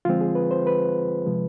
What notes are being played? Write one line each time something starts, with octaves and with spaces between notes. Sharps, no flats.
D3 F3 G#3 C4 F4
G#4
B4
C5
B4
C3 F3 G#3